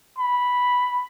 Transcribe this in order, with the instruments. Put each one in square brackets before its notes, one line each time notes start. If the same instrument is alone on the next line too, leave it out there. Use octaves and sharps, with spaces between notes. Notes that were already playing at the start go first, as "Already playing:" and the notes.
[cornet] B5